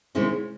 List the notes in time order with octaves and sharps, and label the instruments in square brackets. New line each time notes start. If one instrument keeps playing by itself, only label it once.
[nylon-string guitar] C3 D#3 G#3 C#4 E4